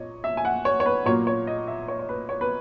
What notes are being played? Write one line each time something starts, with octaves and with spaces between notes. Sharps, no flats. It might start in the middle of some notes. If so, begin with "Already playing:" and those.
Already playing: A#2 C#5 D#5
E5
G#5
F#5
C#5
C#5
B4
A#2 F#3 A#3 C#5
C#5
D#5
E5
C#5
C#5
B4
C#5
B4